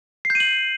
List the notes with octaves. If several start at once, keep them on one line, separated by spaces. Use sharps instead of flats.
C7
G6
D#7
F#7